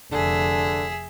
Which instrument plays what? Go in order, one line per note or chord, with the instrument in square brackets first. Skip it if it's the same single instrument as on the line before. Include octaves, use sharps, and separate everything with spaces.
[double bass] F1 [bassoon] D3 [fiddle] G#4 E5